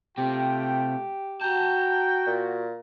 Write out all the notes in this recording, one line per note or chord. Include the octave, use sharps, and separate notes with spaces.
C3 A3 F4 G4 G5
F#4 G5 A5 A#5
A#2